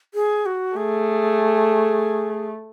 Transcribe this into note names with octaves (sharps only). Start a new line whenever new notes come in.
G#4
F#4
A3 G#4